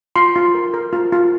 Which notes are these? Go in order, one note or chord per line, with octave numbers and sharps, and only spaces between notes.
F4 C6
F4
A#4
A#4
F4
F4